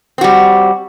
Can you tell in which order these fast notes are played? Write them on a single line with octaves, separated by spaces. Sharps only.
C4 F#4 G3